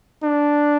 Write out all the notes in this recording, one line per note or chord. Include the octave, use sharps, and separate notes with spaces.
D4